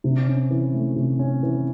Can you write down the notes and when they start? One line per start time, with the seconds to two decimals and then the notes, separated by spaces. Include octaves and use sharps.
0.04 C3
0.27 C#4
0.51 E3
0.74 A3
0.96 C3
1.19 C#4
1.43 E3